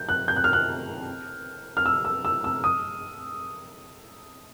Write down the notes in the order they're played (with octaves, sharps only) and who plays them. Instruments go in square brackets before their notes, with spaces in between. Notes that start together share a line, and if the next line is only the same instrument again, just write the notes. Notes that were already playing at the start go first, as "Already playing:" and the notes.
Already playing: [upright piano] G6
F#6
G6
F#6
F6
F#6
F6
E6
E6
E6
E6
D#6